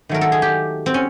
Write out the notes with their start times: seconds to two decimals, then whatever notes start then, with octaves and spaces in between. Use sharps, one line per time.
0.09 D#3 F#3 A3 A#4
0.21 A4
0.32 G#4
0.42 G4
0.86 C4
0.94 C#4